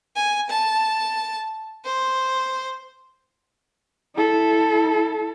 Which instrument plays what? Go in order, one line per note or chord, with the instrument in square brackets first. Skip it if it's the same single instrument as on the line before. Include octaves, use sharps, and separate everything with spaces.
[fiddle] G#5
A5
C5
[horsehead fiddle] E4 A4